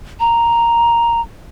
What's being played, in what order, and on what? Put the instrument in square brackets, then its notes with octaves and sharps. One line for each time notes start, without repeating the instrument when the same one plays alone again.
[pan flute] A#5